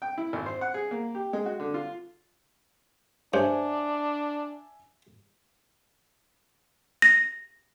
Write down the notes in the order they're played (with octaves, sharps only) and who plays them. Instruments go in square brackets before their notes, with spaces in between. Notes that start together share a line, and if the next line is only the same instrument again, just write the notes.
[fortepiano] G5
E4
G#1
C5
F#5
G#4
A#3
G4
G#3
F#4
D3
F4
[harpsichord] G2 [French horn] D4 [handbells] C5 C#5 [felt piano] E5 G#5
[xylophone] A#6